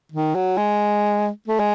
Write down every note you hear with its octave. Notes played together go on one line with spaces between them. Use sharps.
D#3
F#3
G#3
A3
G#3